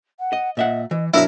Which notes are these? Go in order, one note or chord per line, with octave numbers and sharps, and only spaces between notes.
F#5
D#5
A#2 D#5 E5 F#5
E3 D#5
F#3 D4 E4 A#4 C#5 E5